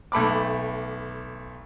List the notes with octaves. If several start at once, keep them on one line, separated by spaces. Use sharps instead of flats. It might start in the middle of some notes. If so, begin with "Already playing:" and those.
B1 A3 B5 D6